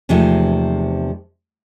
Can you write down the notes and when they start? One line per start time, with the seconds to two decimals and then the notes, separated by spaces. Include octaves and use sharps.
0.09 E2 C3 F3 G#3 A3 D#4